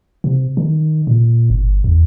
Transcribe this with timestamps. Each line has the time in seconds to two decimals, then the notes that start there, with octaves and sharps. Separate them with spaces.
0.24 C3
0.57 D#3
1.07 A#2
1.50 G1
1.84 E2